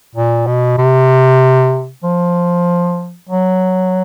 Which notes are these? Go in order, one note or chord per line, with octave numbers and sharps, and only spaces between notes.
A#2
B2
C3
F3
F#3